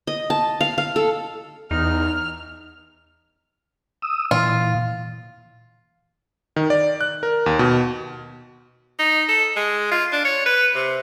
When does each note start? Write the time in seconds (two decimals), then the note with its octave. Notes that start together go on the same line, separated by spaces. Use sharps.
0.07 D#5
0.30 A5
0.61 F5
0.78 F5
0.96 A4
1.71 E2 D#4 F6
4.02 D#6 E6
4.31 A#2 E3 F4
6.56 D#3
6.70 D5
7.01 F#6
7.23 A#4
7.46 D#2
7.59 B2
8.99 D#4
9.29 A4
9.56 G#3
9.91 F4
10.12 D4
10.25 C#5
10.46 B4
10.75 C3